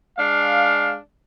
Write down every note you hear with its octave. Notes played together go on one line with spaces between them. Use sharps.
G#3 D4 F5